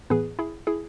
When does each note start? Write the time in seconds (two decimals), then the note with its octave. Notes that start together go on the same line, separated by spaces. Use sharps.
0.10 A2 E3 B3 G#4 B4
0.39 E4 G#4
0.67 E4 G#4